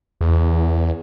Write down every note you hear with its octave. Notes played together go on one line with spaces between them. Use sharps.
E2